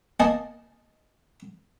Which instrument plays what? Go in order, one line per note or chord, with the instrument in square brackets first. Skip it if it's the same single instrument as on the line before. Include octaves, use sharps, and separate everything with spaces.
[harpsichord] A#3 D#5 G#5 A5